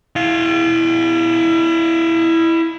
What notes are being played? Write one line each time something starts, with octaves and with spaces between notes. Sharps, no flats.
E4 F5